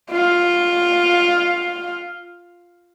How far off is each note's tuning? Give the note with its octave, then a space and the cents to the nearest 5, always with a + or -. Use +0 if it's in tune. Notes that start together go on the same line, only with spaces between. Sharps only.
F4 +5